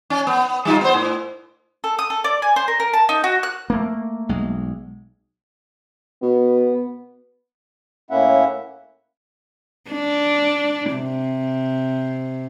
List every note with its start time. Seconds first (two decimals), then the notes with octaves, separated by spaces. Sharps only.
0.10 C#4
0.27 B3
0.65 G3 D#4 F4
0.81 B3 C5
0.94 A2
1.84 A4
1.99 D#6
2.10 A4
2.24 D5
2.42 G#5
2.56 C5
2.68 A#4
2.80 A#4
2.93 A5
3.09 D#4
3.24 F#4
3.43 F#6
3.70 A3 A#3
4.29 B1 G#3
6.22 B2 B3
8.11 A2 A#3 C#4 E4 E5 F#5
9.90 D4
10.93 C3